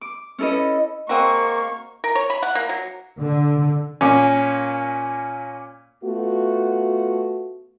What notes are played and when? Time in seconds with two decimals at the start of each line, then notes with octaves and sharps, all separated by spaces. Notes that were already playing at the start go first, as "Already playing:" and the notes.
0.01 D6
0.39 C#4 E4 A4 B4 D#5
1.09 G#3 A#3 C4 F#4 C#6
2.04 A#4
2.15 C#5
2.30 B5
2.43 F#5
2.55 A#3
2.69 F#3
3.19 D3
4.01 A#2 C#4
6.04 A3 B3 F4 F#4